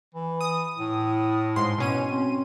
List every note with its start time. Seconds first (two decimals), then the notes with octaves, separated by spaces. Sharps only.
0.14 E3
0.41 D#6
0.78 A2
1.56 G#2 C6
1.78 B2 C#4 D#7
2.08 C4